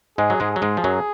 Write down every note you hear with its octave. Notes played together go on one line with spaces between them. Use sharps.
G#2 G#3 G#4
F#3
G#2 G#3
F#3 G#4
G#2 G#3
F3
F#2 F#3